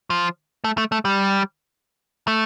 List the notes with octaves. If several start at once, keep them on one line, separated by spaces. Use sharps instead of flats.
F3
A3
A3
A3
G3
A3